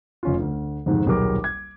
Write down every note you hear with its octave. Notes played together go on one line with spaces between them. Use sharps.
F1 C#4 F4
D2
F2 G#2 C3 D#3
D#1 B1 G4 G#4 A#4 D6
G#6